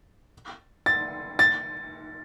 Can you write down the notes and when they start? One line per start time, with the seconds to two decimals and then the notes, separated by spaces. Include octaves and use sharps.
0.86 A6
1.39 A6